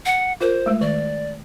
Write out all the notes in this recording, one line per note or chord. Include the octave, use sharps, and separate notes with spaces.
F#5
F4 A#4 C5
G#3 A3
D#3 D5